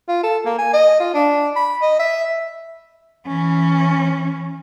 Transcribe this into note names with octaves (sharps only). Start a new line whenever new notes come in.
F4
A4
A#3
G#5
D#5
F4
D4
B5
D#5
E5
E3 C#4